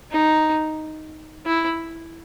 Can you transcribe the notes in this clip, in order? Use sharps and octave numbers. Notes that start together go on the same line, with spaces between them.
D#4
E4